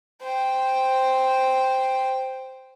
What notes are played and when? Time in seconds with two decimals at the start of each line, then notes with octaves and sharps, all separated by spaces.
0.22 C5 G5